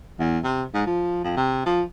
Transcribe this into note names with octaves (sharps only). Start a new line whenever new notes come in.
E2
C3
G#2
F3
F2
C3
F3